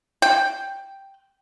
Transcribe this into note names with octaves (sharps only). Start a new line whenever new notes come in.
G5